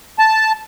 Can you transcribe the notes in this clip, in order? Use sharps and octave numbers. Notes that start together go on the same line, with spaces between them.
A5